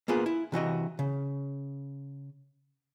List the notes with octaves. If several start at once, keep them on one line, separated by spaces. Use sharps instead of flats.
A#3 B3 F4 G#4
E4
C3 E3 F#4 D#5
C#3